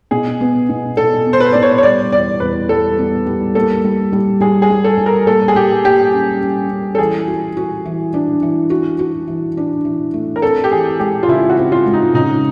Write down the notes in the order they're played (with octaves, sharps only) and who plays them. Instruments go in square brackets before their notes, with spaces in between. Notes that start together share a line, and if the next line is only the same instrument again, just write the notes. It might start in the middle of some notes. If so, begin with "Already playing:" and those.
[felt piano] B2 [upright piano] G#4
[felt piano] B3
B2
[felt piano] B2 [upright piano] A4
[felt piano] B3
[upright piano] C5
B4
[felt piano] B2 [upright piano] D5
[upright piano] C#5
C#5
[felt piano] G3 [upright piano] D5
[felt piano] E2 [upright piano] D5
[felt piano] E2 [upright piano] B4
[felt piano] G3 [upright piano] A4
[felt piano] B3
G3
[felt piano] A#3 [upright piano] A4
[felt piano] G3
G3
[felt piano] G3 [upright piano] G#4
[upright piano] G#4
[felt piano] G3
[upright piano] A4
[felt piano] G3
[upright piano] A#4
[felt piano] A#3 [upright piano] A4
[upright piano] G#4
[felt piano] G3 [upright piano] G4
[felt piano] A#3 [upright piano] G4
[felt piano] C#4
C#4
C#4
[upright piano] A4
[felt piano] E3 [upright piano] G#4
[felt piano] F#4
F#4
E3
D4
E3
F#4
F#4
E3
D4
E3
A3
[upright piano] A#4
[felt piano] C4 [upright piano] A4
[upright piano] G4
[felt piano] E3 [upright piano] G#4
[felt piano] G#3 [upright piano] G4
[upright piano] F4
[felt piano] C#3 [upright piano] E4
[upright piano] F#4
[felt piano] C4
[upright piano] F4
[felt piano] G#3
[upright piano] D#4
[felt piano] C#3 [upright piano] D#4